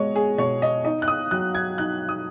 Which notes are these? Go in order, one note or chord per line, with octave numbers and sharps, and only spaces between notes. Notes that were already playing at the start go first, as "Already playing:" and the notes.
Already playing: B2 G#3 C#5 D#5
G#4
B2 C#5
D#5
D#4 D#5
F#6
D#6
F#3 F#6
G#6
D#4 F#6
D#6